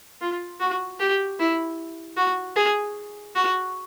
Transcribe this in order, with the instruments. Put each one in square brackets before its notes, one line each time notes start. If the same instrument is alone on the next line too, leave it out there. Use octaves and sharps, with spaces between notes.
[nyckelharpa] F4
F#4
G4
E4
F#4
G#4
F#4